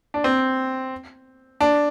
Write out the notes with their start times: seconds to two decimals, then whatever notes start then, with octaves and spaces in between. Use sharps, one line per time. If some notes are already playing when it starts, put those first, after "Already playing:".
0.14 D4
0.24 C4
1.61 D4